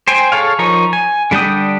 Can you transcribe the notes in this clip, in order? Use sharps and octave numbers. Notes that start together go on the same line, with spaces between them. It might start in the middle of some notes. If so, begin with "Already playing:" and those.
C5 G5 G#5
G#4 A4 C#5 F5
F3 D#4 A#4 C#5 C#6
G#5
D3 G3 D4 G5 D#6